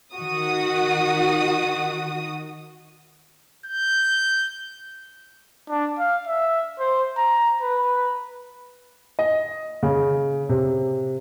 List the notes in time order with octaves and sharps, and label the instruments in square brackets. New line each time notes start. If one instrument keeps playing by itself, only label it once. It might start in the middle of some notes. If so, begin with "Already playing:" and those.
[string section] D#3 F#4 D#6
[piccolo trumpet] G6
[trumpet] D4
F5
E5
C5
A#5
B4
[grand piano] D#5
C#3
C3